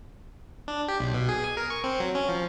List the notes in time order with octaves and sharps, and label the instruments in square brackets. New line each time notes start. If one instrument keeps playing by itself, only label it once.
[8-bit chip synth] D4
G4
B1
B2
G#4
G#5
A#4
C#6
C4
F#3
C#4
F3